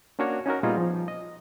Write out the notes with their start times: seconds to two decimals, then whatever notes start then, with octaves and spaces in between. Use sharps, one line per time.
0.19 A#3 C#4 D4 F#4 A#4 C#5
0.46 C#4 D#4 F#4 A#4
0.63 A#2 G3 B3 D#4 F4 G#4
0.77 F3
1.08 D#5